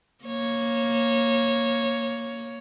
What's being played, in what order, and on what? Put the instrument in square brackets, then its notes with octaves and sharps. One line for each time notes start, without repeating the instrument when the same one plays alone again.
[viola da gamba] A#3 C#5